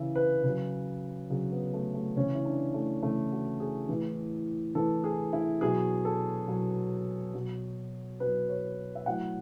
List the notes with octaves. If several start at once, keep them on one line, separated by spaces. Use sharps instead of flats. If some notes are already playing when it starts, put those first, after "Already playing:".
Already playing: C#3 E3 E5
B4
C#3 F#3
C#3 F#3 G#4
B3
A3
A3
C#3 E3 C#4
E4
D4
A3
C#3 E3 A3
F#4
G#4
A2 E3
A2 E3 A4
G#4
E4
B2 F#3 G#4
A4
B2 F#3
B2 F#3
B2 F#3 B4
C#5
E5
A2 F#3 F#5